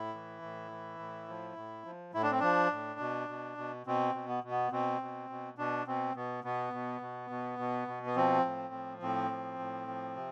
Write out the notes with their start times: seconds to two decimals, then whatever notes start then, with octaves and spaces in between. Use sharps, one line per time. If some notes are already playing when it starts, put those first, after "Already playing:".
Already playing: A2 E4
0.14 E3
0.42 A2
0.71 E3
0.99 A2
1.28 F3
1.56 A2
1.85 F3
2.14 A2 E4
2.23 D4
2.31 C4
2.40 F3 D4
2.72 A2
3.00 B2
3.29 B2
3.58 B2
3.86 B2 C4
4.15 B2
4.28 B3
4.44 B2
4.51 B3
4.72 B2 C4
5.01 B2
5.30 B2
5.58 B2 D4
5.87 B2 C4
6.15 B2 B3
6.44 B2 B3
6.73 B2
7.01 B2
7.30 B2
7.59 B2
7.88 B2
8.06 B3
8.16 F3 C4
8.45 A2
8.73 F3
9.02 A2 C4
9.31 F3
9.59 A2
9.88 F3
10.16 C3